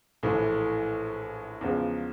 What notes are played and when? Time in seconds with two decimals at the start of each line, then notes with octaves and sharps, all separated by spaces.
0.23 A#1 A2 E3
1.61 E2 C#3 F3 G#3